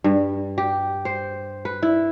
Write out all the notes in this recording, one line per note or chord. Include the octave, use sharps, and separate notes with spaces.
G2
G4
C5
B4
E4